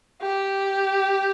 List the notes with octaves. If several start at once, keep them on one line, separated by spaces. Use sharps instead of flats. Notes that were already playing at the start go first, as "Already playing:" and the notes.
G4